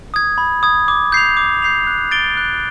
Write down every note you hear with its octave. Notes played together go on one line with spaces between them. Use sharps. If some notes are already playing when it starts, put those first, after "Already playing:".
D#6 G#6
B5
D#6 G#6
D6
G6 C7 F7
D6
G6 C7 F7
F#6
A6 D7 G7
F#6